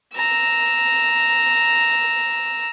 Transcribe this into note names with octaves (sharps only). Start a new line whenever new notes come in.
A#5 E6